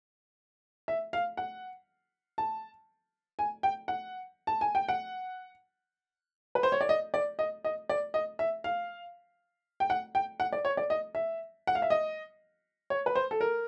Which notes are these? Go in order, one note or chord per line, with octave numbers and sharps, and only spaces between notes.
E5
F5
F#5
A5
G#5
G5
F#5
A5
G#5
G5
F#5
B4
C5
C#5
D5
D#5
D5
D#5
D#5
D5
D#5
E5
F5
G5
F#5
G5
F#5
D5
C#5
D5
D#5
E5
F#5
F5
E5
D#5
C#5
B4
C5
A4
A#4